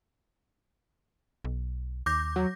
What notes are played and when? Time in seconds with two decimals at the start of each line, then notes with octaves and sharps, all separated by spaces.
1.44 B1
2.06 D#2 D6 G6 A#6
2.36 F#3